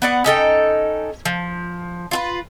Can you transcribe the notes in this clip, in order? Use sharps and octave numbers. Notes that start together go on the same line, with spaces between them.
B3 D5 F#5
C#4 D#4 A4 G5
F3
F4 F#4 B4